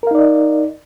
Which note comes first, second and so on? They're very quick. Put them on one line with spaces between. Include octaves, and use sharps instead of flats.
A#4 F5 D#4 D5 D#5